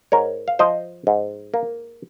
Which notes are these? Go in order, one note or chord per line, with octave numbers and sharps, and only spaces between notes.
G#2 A#4 C#5
F5
F3 C5 D#5
G#2
A#3